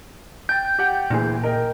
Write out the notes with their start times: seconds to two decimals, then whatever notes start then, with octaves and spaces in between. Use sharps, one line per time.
0.49 G5 G6 A6
0.79 G4 F#5 G5
1.10 D2 A#2 E3 G#4
1.43 A#4 D#5 G5